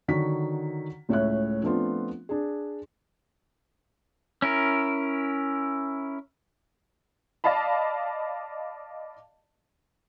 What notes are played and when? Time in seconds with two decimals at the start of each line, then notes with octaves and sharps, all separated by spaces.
0.08 D3 D#3 F#3 C#6 B6
1.09 C#2 A2 C#5 E5 F#6
1.63 F3 A3 B3 C4 D4 F4
2.29 D4 G#4
4.42 C#4 E4 A#4
7.44 D5 D#5 F5 A5 B5